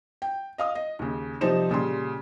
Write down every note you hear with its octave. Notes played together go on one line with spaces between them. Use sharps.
G5
D#5 F5 D#6
D#5
D#2 C#3
C3 F3 G3 D#4 C5 E7
A#2 C#3 G3 C6